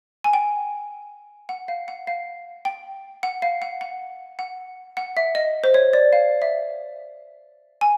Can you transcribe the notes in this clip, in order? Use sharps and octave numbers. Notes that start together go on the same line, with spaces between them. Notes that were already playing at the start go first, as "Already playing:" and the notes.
G#5
G5
F#5
F5
F#5
F5
G5
F#5
F5
F#5
F#5
F#5
F#5
E5
D#5
C5
C#5
D5
F5
E5
G#5